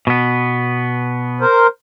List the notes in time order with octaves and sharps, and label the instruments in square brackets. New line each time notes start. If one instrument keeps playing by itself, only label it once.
[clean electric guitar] B2 B3
[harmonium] A#4 C5